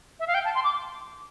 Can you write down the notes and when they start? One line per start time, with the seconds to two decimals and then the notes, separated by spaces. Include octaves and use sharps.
0.20 E5
0.27 F5
0.34 G5
0.45 A5
0.55 C6
0.64 D6